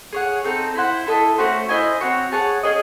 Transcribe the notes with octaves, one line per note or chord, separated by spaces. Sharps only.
G#4 C#5 F#5
C4 D#4 A4
E4 C5 F#5
E4 A4 D#5
A3 C#4 F#4 C5
E4 C5 D#5 G#5
C4 F#4 C#5
G#4 C#5 F#5 A5
C#4 G#4 D#5 G#5